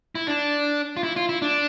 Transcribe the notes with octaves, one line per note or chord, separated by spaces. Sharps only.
E4
D4
F4
E4
F4
E4
D4